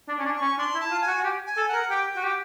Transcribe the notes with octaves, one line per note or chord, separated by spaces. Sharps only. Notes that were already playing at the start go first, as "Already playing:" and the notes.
D4
C#4
D4
C#6
C#4
D4 C6
E4
A5
F4
G#5
F#4
F#4
G4
G#5
A4
A#4 F#5
G4 G5
G5
F#4
G4